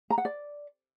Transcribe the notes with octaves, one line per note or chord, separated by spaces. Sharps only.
A#5
F#5
D5